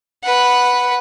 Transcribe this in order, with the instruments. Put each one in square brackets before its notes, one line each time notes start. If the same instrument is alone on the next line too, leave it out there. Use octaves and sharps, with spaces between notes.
[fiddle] B4 F#5